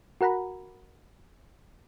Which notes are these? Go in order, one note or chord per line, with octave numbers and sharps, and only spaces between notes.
F#4 A#4 F#5 A#5 B5